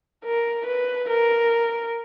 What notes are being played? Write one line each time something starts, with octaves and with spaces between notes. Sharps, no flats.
A#4
B4
A#4